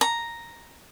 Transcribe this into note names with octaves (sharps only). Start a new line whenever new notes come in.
A#5